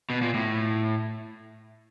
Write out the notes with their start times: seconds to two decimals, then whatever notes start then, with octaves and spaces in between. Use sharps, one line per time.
0.10 B2
0.22 A#2
0.34 A2